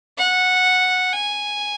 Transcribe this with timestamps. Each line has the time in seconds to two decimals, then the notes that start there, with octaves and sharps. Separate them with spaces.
0.18 F#5
1.13 G#5